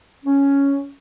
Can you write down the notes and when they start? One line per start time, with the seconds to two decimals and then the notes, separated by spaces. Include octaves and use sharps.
0.25 C#4